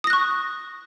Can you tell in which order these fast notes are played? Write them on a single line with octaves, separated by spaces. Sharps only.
D#6 A#6 F#6 C#6